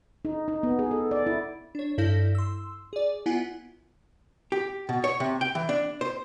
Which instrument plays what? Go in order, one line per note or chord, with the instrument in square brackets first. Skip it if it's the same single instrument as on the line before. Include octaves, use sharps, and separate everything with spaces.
[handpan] D#4
D#4
B3
G#4
A4
D5
E4
[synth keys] D4 C#5
G2 E4 A4 F5 G6 A#6
C6 E6
G#4 D5
B3 E4 F4 F#5 G#5
[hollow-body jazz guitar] G4
B2
C#5
C3
G5
E3
D4
C5